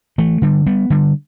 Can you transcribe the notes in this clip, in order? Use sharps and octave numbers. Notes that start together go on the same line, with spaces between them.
E3 A3
D3 G3
G3 B3
D3 G3